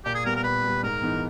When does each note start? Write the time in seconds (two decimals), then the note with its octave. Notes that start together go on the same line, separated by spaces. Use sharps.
0.05 A#2 G4
0.15 G#4
0.25 G3 B3 A#4
0.35 A#4
0.44 A#2 B4
0.64 G3 B3
0.83 G#2 A#4
1.02 E3 G#3 B3 D#4